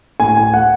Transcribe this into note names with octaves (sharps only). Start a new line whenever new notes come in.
A2 G#5
G#5
F#5